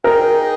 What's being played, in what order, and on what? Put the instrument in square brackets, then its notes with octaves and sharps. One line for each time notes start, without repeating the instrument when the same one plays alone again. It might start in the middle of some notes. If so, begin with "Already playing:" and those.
[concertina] D#4 G#4 D#5 G5 [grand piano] A#4